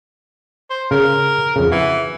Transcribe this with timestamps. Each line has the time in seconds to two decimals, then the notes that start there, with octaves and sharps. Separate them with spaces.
0.70 C5
0.91 C#3 A#4
1.56 F2 C#3
1.71 E3 F#4